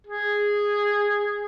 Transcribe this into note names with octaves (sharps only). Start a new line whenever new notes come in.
G#4